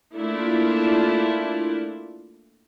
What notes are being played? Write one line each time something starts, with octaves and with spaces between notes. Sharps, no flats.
A3 A#3 D4 E4 F4